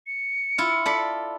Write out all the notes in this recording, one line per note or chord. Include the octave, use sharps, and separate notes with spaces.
C#7
E4 F4
A4 D5 B5